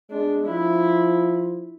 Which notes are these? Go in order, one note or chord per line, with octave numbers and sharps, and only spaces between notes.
G#3 D4
F3 E4